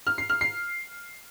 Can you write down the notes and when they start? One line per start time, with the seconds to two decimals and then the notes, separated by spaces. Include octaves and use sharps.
0.07 F6
0.18 C7
0.30 F6
0.41 C7